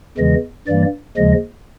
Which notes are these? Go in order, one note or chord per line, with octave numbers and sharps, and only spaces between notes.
E2 C#3 E3 G#3 D#5
G2 E3 G3 A#3 D5
D#2 C#3 F3 G#3 D#5